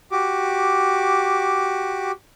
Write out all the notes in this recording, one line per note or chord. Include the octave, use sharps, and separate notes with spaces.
F#4 G4 D6